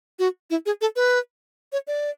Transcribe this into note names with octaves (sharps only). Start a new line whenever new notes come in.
F#4
E4
G#4
A4
B4
C#5
D5